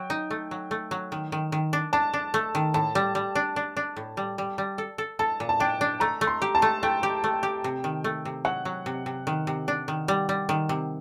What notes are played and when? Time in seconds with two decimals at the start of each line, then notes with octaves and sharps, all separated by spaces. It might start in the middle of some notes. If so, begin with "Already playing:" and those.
Already playing: F#3 G5
0.10 D#4
0.31 A3
0.51 F#3
0.71 A3
0.91 F#3
1.12 D#3
1.32 D#3
1.52 D#3
1.73 D4
1.93 D4 A5
2.14 D4
2.34 A3
2.55 D#3
2.74 A2 A5
2.95 G3
3.15 G3
3.35 D4
3.56 D4
3.77 D4
3.97 A2
4.17 G3
4.38 G3
4.58 G3
4.78 A4
4.98 A4
5.19 A4 A5
5.40 A#2
5.49 A5
5.60 D4 G5
5.81 D4
6.00 A3 A#5
6.21 A3
6.27 C6
6.42 G4
6.55 A5
6.62 A3
6.83 A3 G5
7.03 G4
7.24 A3
7.43 G4
7.64 C3
7.84 D#3
8.04 A3
8.25 C3
8.45 F#3 F#5
8.65 F#3
8.86 C3
9.06 C3
9.27 D#3
9.47 C3
9.68 D4
9.88 D#3
10.08 G3
10.29 G3
10.49 D#3
10.69 C3